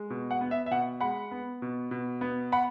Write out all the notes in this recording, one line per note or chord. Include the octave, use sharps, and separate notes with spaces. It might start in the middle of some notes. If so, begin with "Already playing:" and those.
Already playing: G#3
B2
F#5
B3
E5
E5
B2 F#5
G#3 F#5 B5
B3
B2
B2
B3
F#5 B5